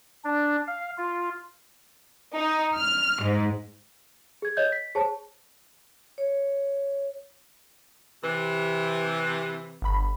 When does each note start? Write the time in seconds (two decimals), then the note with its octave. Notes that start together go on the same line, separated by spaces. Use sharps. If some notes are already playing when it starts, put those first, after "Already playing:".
0.24 D4
0.67 F5
0.98 F4
2.36 D#4
2.75 F6
3.21 G#2
4.42 G#4 G#6
4.57 C#5 D#5 G6
4.72 B6
4.95 G#4 C5 C#5 A5
6.18 C#5
8.24 C3 E3
9.82 G1 B5